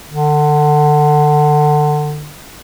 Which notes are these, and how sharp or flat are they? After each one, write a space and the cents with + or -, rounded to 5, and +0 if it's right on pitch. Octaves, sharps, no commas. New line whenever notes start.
D3 +25